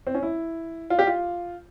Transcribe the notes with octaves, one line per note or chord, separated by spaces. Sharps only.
C4
C#4
E4
F4
G4
F4